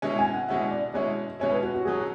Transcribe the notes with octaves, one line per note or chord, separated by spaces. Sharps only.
B2 G#3 C#4 E4
G#5
F#5
B2 G#3 C#4 E4 F#5
D5
B2 G#3 C#4 E4 C#5
B2 G#3 C#4 E4 C#5
B4
F#4
F#4
B2 F#3 C#4 G#4